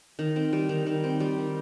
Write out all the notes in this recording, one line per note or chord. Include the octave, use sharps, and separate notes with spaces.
D#3
C4
G3
D#3
D#3
C4
G3
D#3